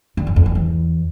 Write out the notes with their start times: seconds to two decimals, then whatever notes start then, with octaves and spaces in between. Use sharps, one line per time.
0.17 D3
0.27 F#2
0.36 F2
0.46 F#2
0.55 E2